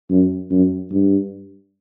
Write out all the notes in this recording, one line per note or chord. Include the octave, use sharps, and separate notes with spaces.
F#2
F#2
G2